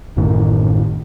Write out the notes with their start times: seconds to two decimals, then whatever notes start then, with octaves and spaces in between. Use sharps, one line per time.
0.16 A1 F#2 A2 D#3